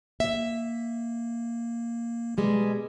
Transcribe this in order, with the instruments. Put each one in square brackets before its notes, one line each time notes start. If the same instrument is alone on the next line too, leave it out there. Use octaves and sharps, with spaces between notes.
[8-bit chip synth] A#3 [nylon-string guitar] E5
[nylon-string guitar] B2 G3 G#3